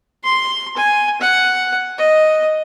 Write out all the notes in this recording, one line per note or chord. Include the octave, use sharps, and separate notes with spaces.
C6
G#5
F#5
D#5